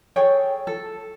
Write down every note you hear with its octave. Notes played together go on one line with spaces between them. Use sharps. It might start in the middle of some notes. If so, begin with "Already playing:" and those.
G#4 A4 C#5 G5
A4